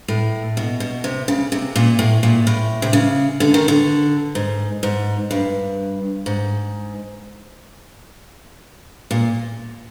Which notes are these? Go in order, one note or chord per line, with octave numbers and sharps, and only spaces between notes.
A2
B2
B2
C3
C#3
C3
A#2
A2
A#2
A2
C3
C#3
D3
D#3
D3
G#2
G#2
G2
G#2
A#2